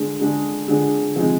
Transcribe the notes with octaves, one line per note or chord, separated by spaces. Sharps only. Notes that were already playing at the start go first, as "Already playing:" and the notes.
Already playing: D3 G#3 D4 G#4
D3 G#3 D4 G#4
D3 G#3 D4 G#4
C3 F3 G#3 D#4 G#4